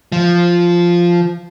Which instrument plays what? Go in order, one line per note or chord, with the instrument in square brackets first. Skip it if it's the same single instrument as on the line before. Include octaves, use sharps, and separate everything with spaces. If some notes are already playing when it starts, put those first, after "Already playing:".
[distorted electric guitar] F3